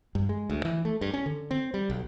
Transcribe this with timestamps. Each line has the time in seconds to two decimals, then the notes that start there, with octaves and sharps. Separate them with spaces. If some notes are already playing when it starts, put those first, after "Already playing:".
0.15 G2
0.29 G#3
0.50 D2
0.65 E3
0.85 A3
1.01 G2
1.14 C#4
1.26 D3
1.51 C4
1.74 G3
1.90 B1